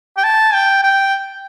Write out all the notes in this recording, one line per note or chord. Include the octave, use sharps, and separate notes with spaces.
G5
A5
G5
G5